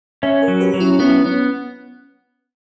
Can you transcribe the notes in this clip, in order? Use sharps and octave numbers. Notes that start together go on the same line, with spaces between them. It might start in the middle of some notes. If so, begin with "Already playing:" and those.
C#4 C#5 E5
A#4 C#5
F#3
G4 B4
F#3
C#4 E4
B3 C#4 E4
B3 C#4